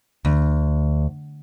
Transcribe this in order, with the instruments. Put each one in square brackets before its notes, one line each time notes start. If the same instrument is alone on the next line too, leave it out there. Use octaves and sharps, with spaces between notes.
[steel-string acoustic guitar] D2